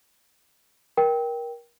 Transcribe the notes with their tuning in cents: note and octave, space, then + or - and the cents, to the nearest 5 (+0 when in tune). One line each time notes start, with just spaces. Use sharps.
A#4 +25 G5 +0